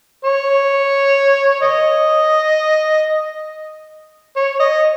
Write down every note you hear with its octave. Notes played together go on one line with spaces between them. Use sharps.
C#5
D#5
C#5
D#5